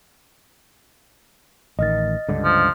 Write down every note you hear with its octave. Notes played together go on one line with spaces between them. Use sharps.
A1 D#3 D#5 F6 A6
C#2 G2 D3
F3